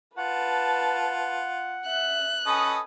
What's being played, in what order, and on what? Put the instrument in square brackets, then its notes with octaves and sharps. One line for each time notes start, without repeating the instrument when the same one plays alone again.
[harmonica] F4 [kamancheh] B4 A5 [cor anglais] F#5
[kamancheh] E5 [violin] F#6
[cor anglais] C#4 [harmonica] A4 B4 D#5 [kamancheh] G#5 D#6